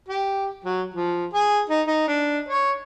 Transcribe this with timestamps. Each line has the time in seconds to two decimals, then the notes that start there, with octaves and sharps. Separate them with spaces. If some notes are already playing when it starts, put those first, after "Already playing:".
0.08 G4
0.64 F#3
0.94 F3
1.33 G#4
1.69 D#4
1.87 D#4
2.08 D4
2.48 C#5